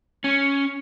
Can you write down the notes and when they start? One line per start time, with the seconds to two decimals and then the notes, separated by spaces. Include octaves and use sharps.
0.24 C#4